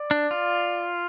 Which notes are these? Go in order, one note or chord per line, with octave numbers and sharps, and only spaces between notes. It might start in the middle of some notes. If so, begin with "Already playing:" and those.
Already playing: D5
D4
F4